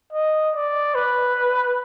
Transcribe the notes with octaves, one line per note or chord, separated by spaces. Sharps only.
D#5
D5
B4